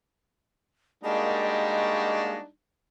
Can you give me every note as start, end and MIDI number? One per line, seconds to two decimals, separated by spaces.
1.04 2.47 55
1.04 2.35 56
1.04 2.35 58
1.04 2.47 62
1.04 2.47 63
1.04 2.35 66
1.04 2.29 75